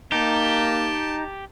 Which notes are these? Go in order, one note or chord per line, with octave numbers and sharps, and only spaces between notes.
A#3 D#4 G4 A5